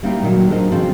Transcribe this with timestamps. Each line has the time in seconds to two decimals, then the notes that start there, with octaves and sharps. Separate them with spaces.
0.03 G3 A#3 C4 D#4 E4 G4
0.22 A#2 D#3 F#3
0.49 D4 F4 A4 A#4 C5 D#5
0.72 C#3 F3 C4 D4 F#4 A4